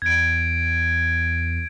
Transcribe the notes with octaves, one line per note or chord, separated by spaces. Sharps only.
E2 G#6 D7